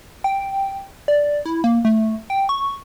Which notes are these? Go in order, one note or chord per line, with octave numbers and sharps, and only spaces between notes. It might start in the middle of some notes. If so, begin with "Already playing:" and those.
G5
D5
E4
A#3
A3
G5
C#6